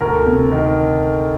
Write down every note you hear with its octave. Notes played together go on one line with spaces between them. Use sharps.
D2 A#4
C3
D#3